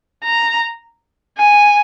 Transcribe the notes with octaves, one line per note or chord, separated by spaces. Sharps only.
A#5
G#5